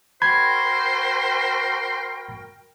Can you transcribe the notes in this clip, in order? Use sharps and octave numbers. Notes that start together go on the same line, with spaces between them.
F#4 A#4 C5 G5 B5 G#6